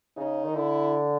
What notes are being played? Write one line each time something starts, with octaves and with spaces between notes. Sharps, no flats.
C#3 D#4
D#3
D3 E4